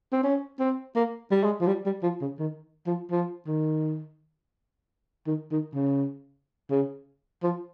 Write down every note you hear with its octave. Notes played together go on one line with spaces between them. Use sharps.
C4
C#4
C4
A#3
G3
G#3
F3
G3
G3
F3
C#3
D#3
F3
F3
D#3
D#3
D#3
C#3
C#3
F3